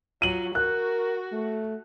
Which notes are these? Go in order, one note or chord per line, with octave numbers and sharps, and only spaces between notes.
F#3 F4 D#7 F#7
F#4 A#4 F#6
A3